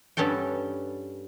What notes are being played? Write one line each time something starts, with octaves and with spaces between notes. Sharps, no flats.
G2 B3 C#4 A4 G5